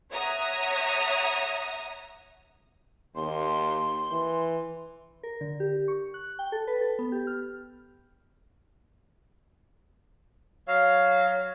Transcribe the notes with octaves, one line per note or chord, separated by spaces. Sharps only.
C#5 E5 F#5 A#5 D#6
D#2 C6
E3
A#4
D3
G4
C#6
F#6
G5
A4
B4
A4
B3
G4
F6
F#3 F5